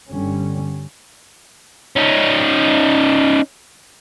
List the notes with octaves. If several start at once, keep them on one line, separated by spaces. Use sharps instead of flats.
G1 D3 G3 C#4
C#4 D#4